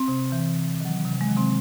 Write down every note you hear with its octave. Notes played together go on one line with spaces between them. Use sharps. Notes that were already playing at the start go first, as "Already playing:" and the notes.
Already playing: C4
C3
E3
C3
D#3 F#3
C3
G#3
D#3 F#3
C3 C4